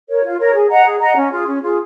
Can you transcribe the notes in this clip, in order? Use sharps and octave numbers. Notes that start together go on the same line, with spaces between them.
A#4 C#5
F4
A#4 C#5
G#4
D#5 F#5 A#5
G#4
D#5 F#5 A#5
C#4
F4 G#4
C#4
F4 G#4